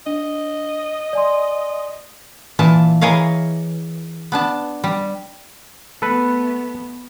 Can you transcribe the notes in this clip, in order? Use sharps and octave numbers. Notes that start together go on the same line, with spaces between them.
D4 D#5
D5 G#5 C6
A#2 E3 A5
E3 G#4 A#4 C#5 D#5 F5
B3 D4 A5
G3
A3 B3 A4 B4